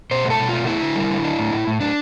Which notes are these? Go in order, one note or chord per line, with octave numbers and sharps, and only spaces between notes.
B2 C5
A3
A4
B2
A3 F4
B3 E4
D3
G3
D3
D4
A2
A2
A2
A2 D4